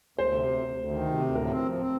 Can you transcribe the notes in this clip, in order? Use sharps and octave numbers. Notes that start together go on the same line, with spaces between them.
D2 C5
C3
D2
D2
D2
D#3
C3
D2
A2 A#4
C4
F3
C4